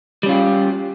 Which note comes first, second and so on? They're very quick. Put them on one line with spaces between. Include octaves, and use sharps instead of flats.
G3 C#4 F4 G4